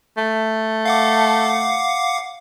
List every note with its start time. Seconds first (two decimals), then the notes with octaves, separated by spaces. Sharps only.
0.17 A3
0.85 F5 F#5 D6